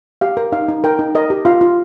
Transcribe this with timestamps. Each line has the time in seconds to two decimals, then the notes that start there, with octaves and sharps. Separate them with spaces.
0.21 G4 F5
0.37 A#4
0.52 D#4 F5
0.69 D#4
0.84 A#4 G5
0.99 D#4
1.15 A#4 D#5
1.30 G4
1.45 F4 F5
1.61 F4